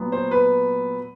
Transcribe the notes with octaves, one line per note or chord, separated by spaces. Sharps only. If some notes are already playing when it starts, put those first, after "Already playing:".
Already playing: A#2 F#3 B3
C5
B4